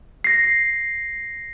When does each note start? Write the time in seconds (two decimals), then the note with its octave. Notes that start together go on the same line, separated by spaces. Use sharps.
0.24 A#6 C7